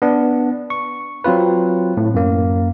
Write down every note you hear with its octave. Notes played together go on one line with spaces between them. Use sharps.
B3 D4
C#6
F#3 C4 F4 B4
A2
F#2 A#3